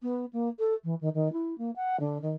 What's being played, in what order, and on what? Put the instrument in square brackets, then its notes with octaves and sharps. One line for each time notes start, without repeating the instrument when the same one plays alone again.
[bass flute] B3
A#3
A4
E3
D#3
D#3
E4
A#3
F#5
D3
D#3